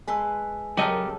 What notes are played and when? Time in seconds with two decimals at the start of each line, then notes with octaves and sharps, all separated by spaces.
0.08 G#3 B4 G#5 A5 C6 E6
0.77 F#2 C#3 G4 A4 A#4 D#5